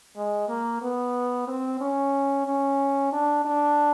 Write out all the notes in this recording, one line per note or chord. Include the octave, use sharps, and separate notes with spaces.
G#3
A#3
B3
C4
C#4
C#4
D4
D4